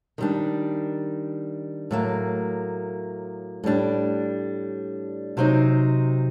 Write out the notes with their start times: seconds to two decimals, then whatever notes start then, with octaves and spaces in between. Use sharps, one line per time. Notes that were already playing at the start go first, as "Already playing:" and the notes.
0.18 D#3 G3 D4
1.91 A2 F#3 A#3
3.64 A2 G3 D4
5.37 C3 F#3 C4 D#4